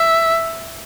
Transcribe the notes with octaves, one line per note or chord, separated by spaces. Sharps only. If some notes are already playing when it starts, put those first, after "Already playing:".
Already playing: E5